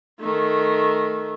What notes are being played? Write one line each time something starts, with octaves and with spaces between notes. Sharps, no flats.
D#3 A3